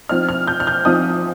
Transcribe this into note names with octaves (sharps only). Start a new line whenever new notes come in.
F3 C4 D#4 F6
F6
G6
F6
G6
F3 C4 D#4 D#6